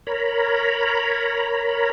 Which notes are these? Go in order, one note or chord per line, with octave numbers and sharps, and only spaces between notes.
A#4 C#5 A#5 B5